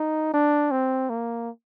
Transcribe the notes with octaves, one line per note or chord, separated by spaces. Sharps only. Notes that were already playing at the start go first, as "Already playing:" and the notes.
Already playing: D#4
D4
C4
A#3